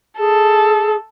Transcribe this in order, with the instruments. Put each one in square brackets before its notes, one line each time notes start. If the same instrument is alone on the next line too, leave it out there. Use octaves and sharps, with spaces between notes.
[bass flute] G#4 [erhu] A4